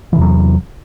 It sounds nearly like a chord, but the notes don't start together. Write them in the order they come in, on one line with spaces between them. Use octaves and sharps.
E3 C3 E2 F#3